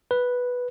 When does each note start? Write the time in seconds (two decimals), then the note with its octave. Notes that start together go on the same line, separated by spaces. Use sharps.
0.11 B4